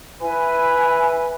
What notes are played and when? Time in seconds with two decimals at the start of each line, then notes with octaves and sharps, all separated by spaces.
0.21 E4 B4 G#5